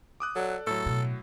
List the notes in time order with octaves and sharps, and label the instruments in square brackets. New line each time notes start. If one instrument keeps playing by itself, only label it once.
[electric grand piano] D6 D#6 F#6
[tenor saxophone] F#3 [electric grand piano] A4 D5
[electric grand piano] A2 F#3 [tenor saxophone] A4
[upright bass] B2